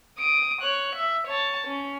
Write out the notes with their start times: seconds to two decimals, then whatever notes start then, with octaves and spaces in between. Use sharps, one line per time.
0.19 D#6 D7
0.62 C#5 F#6
0.96 E5
1.27 C#5 A5
1.67 C#4